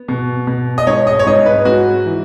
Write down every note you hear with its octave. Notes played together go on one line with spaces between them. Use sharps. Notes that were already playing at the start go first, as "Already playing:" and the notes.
Already playing: B3
B2
B2
D#5
G#2 C#5
D#5
C#5
G#2 D#5
B4
G#2 F#4
E3